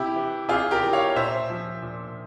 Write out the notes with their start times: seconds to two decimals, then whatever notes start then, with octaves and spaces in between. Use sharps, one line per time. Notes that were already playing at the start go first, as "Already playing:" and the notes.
Already playing: C3 E4 G4
0.16 E3
0.49 C3 F4 G#4
0.71 G4 A#4
0.82 E3
0.93 C#5 F5
1.10 C#5
1.16 A#2 C5 E5
1.50 F3
1.82 A#2